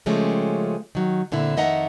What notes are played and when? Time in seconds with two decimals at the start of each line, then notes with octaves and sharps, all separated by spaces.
0.06 C#3 F3 G#3 A3 C#4 G4
0.95 D#3 F#3
1.32 A#2 D3 C4 E4
1.57 F2 D#3 D#5 E5 F#5 A#5